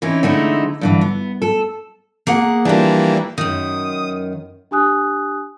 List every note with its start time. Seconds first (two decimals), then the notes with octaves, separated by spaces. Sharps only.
0.02 E3 C4 C#4 D#4 E4
0.23 D3 G#3 A3 C4 D#4 E4
0.81 G2 D3 E3
1.01 B3
1.42 A4
2.27 A#3 G#4 F#5
2.65 E3 F3 G3 A#3 D4
3.38 F#2 D#3 D#6
4.71 D4 G4 G#5 D#6 F#6